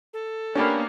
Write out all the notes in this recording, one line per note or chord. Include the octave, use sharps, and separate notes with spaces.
A4
A#3 B3 C#4 D4 G4 D5 B5